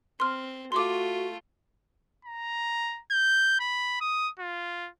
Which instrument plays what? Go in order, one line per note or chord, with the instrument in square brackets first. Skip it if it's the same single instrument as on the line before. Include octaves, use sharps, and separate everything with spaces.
[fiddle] C4 [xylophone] C6 F6
[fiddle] A3 F4 [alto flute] F#4 [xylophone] C6 D6
[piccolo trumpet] A#5
G6
B5
D#6
F4